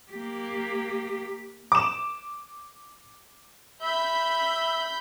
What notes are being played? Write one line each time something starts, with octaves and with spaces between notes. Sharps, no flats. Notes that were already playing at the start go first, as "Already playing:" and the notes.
A#3 G4
D6 E7
E5 B5 G6